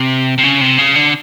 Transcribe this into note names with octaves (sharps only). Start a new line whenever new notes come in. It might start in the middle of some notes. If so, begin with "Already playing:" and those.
Already playing: C3
C3
C#3
C3
C#3
D3